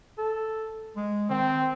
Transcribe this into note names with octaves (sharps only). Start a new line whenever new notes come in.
A4
G#3
D#3 C4